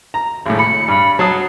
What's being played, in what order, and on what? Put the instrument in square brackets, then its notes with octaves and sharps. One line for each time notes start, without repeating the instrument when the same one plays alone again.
[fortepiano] A#5
G#1 A2
[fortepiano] B5 [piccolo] C#7
[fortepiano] G2 [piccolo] B5
[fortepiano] F#3 A5 D#6 [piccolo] C7